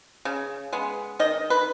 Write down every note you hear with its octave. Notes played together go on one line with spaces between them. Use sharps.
C#3
G#3 B3
D#3 D#5
B4